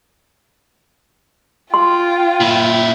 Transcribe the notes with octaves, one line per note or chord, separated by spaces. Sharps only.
F4 G5 C6
A#2 E4